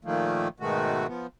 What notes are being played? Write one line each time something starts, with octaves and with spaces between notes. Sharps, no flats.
A#2 D#3 F3 A3 A#3
G#2 B2 D#3 G#3 A3 F#4
F3 B3